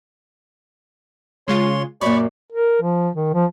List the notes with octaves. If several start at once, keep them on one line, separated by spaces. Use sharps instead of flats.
C#3 G#3 F4 C#5 C6
F#2 A#2 C#5 D5 B5 C#6
A#4
F3
D#3
F3